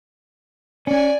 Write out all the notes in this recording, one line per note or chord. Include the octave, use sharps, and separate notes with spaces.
C#4 D5 G#5